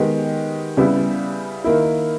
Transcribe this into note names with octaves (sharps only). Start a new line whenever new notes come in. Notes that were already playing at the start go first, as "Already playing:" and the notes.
Already playing: D#3 G#3 B3 G4
C#3 G3 B3 E4
D#3 A#3 E4